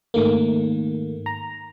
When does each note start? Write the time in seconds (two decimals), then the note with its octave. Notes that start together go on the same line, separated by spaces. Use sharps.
0.14 G#2 D#3 A3 A#3
1.26 A#5